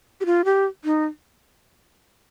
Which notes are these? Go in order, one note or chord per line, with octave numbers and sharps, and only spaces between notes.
G4
F4
G4
D#4